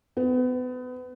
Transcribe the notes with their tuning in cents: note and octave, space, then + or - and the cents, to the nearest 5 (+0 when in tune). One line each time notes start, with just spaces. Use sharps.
B3 +30